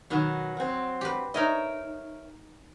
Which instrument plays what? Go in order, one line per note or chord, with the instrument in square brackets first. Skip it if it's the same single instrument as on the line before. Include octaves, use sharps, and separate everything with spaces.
[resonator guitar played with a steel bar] B2 D#3 F#3
F#3 C4
[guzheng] G4 B4
[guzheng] D#4 D#5 [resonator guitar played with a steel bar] A#4 C#5 E5